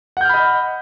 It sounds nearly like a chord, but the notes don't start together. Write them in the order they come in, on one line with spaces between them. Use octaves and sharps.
F#5 G6 F6 B5 D#5